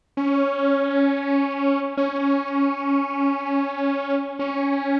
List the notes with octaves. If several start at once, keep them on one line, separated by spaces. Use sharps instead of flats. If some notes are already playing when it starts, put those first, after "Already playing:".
C#4
C#4
C#4